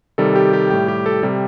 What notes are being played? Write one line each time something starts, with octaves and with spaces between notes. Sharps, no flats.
C3 D#3 G3 A4
G4
G4
A2 G3 G4
G4
A4
C3 G3